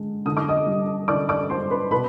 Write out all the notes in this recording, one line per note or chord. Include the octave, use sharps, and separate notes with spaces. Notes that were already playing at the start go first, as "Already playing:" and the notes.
Already playing: D3 G#3
D3 D#6
D6
D#5 D#6
G3
D3 D5 D6
D5 D6
G3 C5 C6
B4 B5
B2 B4 B5